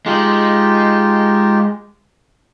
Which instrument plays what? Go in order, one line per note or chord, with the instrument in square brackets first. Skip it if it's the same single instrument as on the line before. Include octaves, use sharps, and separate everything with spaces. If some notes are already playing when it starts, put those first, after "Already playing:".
[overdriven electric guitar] G#3 [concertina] D#4 F4 G4